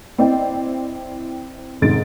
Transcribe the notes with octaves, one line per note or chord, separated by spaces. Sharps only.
C4 E4 D5 D#5 G5
F1 D#2 G#2 A6 D7